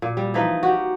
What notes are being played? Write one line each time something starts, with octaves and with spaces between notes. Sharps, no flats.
A#2
G3
E3 F3 D#4 B4
F#4 G4